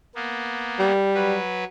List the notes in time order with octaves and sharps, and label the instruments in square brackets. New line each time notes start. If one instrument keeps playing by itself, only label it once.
[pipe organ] A#3 B3
[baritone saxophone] G3
[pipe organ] F#3 B4